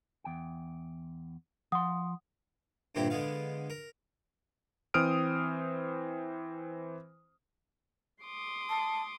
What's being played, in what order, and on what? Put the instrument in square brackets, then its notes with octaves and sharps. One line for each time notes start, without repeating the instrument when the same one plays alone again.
[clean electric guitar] E2 G5
[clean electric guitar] F3 C6 [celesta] F#5 D#6
[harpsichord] G2 A#2 D3 C4 E4 G4
D3 G#3 B3 F5
A#4
[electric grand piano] E3 C4 C5 D#6 F6 D7
[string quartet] C6 D6 D#6
[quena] A5